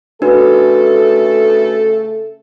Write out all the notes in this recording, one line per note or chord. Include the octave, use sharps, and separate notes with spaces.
C#3 A3 D4 F#4 A4 B4